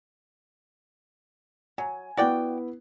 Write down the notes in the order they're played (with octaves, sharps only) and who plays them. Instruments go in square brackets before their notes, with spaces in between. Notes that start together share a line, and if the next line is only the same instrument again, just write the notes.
[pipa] F#3 [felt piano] G#5
[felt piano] B3 E4 [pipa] F#4 D5 G5